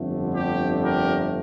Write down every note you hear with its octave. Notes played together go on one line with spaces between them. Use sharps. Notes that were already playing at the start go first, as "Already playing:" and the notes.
Already playing: G1 F2 D3 A3
G4
G4 A#4